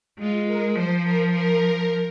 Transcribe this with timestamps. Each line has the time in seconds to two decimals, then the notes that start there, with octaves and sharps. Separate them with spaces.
0.19 G#3 F4
0.47 A#4
0.75 F3 C5
1.03 A#4
1.31 A#4